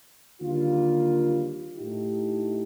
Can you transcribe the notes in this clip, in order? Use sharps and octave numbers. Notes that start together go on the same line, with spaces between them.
D#2 D3 G3 A#3 F4
A2 A3 D#4 G4